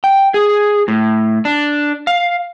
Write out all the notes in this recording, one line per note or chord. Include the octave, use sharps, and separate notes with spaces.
G5
G#4
A2
D4
F5